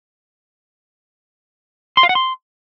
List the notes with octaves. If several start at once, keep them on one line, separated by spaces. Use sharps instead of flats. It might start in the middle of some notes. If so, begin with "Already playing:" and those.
C6
F5
F#5
C6